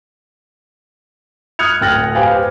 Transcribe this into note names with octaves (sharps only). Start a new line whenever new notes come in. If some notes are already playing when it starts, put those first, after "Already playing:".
D#6 F6 F#6 G#6 C#7 F7
D1 G5 F6 A6 A#6 F#7
G4 B4 C5 F5 G5 G#5